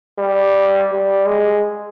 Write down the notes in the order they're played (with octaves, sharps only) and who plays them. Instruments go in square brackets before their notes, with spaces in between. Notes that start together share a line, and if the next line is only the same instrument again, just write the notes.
[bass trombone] G3
G3
G#3